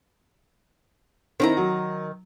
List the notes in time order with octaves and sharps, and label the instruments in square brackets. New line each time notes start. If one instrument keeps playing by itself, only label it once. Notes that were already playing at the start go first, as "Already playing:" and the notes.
[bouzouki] D#3 C5 A#5 [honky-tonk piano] C4 D#4 E4
[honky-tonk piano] F#3